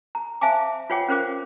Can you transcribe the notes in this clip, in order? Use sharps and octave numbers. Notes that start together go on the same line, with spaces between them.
A#5
C5 E5 F5 G#5 A5 D6
F4 B4 C#5 F#5 G5 D6
C#4 A#4 C5 F5 D6